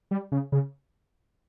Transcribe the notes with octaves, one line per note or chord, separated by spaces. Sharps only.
G3
C#3
C#3